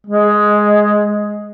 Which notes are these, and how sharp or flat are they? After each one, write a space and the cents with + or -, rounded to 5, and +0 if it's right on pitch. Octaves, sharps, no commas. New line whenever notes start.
G#3 +5